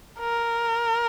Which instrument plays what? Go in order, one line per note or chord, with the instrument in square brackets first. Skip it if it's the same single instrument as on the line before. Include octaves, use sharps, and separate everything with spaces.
[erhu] A#4